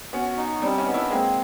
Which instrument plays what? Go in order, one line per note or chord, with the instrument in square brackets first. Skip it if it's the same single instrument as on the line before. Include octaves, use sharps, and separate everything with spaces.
[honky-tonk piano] B3 C#4 [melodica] F#4
[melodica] D#4
[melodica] G3 [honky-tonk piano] C4 D4
[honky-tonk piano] C#4 D#4
[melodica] B3
[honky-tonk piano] D4 E4
[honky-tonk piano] G#3 A#3 [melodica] C4